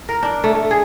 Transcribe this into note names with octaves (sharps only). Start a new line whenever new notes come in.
A#4
D4
A3
A3
G#4